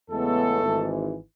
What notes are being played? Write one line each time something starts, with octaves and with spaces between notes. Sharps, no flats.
E2 C#3 G#3 A3 B3 A4
G#1 G#2 E3